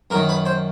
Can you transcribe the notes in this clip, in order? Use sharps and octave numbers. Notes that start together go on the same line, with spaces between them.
F#2 D#3 A#4
B4
C5